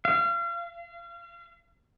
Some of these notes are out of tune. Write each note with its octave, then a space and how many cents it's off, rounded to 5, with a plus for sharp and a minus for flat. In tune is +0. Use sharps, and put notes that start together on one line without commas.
F5 -35